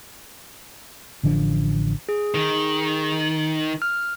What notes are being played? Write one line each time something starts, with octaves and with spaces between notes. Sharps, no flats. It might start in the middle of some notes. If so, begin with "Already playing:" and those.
A1 D3 F3 D4
G#4
D#3
F6